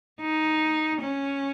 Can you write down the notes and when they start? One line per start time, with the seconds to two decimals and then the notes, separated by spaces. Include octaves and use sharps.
0.20 D#4
1.01 C#4